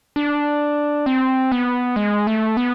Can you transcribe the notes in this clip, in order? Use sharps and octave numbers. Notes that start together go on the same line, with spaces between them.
D4
C4
B3
G#3
A3
B3